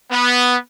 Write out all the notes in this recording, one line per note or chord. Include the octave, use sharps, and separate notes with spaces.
B3